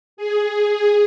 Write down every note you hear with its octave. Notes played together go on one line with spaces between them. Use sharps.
G#4